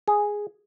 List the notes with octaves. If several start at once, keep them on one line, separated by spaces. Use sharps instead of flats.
G#4